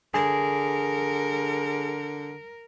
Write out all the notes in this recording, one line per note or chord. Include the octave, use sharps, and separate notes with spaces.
D3 G#4 A#4